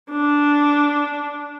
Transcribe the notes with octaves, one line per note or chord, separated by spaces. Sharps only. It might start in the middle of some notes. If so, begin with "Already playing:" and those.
D4